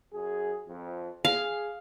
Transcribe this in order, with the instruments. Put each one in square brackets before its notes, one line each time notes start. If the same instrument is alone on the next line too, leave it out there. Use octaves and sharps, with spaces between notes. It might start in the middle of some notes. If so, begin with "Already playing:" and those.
[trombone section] F#2 G#4
F2
[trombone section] G#4 [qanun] F5